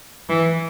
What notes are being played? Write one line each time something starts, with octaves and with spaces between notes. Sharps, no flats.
E3